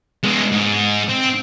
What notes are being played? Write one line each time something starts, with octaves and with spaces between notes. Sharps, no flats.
G#3 B3
G#2
C4